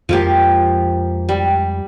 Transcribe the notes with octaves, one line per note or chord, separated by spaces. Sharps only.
F2 F3 G#3 A#3 G4
G3